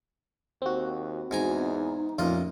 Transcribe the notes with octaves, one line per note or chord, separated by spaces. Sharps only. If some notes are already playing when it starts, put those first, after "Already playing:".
D#2 C4 F#4
E2 G#2 D#4 G#5 A#5
A1 F2 A#2 F4 D#5